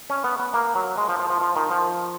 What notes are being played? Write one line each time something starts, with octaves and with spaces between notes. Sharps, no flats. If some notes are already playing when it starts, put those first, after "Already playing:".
C#4
B3
B3
A#3
F#3
G#3
F3
F3
F3
F3
D#3
F3